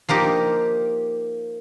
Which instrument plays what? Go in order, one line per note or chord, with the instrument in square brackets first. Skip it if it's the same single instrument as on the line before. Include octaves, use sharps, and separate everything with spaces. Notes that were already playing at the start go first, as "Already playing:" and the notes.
[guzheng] F3 A#3 D#4 G4